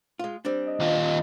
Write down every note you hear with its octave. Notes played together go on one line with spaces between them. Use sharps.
G#3 F4
G3 C4 D4
D#5
D#2 F4